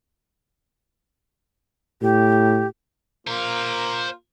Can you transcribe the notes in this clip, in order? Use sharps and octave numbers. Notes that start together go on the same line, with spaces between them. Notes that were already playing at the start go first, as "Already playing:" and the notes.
A2 G4
A#3 F4 C5 A#5